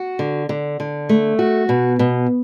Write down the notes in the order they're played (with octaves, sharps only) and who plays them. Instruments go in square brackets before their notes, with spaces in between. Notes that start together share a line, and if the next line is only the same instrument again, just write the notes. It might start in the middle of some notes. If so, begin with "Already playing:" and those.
Already playing: [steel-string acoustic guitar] F#4
D3
D3
D3
A3
F#4
B2
B2